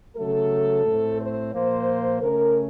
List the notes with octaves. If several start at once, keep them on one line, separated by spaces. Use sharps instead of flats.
C#3 F#3 A3 A4
A2 A3 C4
C5
A#2 F3 A#3 C5
C#3 A3 C#4 A#4